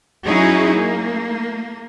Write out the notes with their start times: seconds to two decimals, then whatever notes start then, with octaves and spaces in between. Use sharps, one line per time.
0.24 F#3 C#4 D#4 E4 F#4 G#4
0.76 A#3